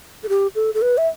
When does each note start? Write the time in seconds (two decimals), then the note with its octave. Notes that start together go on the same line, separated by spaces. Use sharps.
0.23 A4
0.29 G4
0.55 A4
0.74 A4
0.82 B4
0.98 E5